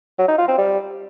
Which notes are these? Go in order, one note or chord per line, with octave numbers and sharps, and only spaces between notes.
F#3
D#4
F4
C4
G3